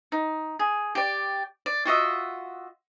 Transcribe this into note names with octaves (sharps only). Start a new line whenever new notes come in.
D#4
G#4
G4 D5
D5
F4 F#4 D#5 E5